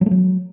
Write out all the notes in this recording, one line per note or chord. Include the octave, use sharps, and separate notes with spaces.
F#3
A3
F#3